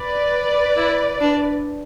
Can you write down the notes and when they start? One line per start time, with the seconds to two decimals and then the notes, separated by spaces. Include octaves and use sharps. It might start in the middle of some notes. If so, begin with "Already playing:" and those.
Already playing: B4 D5
0.77 E4
1.21 D4